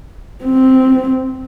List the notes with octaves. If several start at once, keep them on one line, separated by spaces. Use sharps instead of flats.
C4